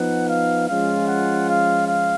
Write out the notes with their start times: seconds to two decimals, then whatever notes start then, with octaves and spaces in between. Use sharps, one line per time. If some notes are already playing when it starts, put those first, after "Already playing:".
Already playing: F3 B3 D#4 F#5
0.28 F5
0.68 F3 G#3 C#4 F4 F5
1.07 F#5
1.48 F5
1.87 F5